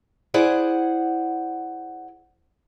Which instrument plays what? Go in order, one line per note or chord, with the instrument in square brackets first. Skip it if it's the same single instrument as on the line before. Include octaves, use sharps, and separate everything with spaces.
[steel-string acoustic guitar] E4 G#4 C5 D5 F#5